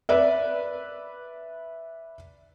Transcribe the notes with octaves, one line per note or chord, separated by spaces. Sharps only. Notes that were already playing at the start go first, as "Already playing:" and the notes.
B4 D5 E5